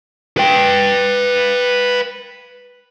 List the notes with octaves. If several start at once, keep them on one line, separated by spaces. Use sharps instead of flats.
B4 G5